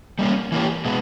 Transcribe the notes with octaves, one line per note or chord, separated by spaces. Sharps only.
G3 A#3 C#4
E3 A#3 C#4 G4
B2 G#3 B3